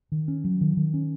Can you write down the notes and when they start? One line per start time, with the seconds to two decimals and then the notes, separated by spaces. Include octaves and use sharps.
0.12 D#3
0.28 C#4
0.44 F#3
0.61 D#3
0.77 D#3
0.94 C#4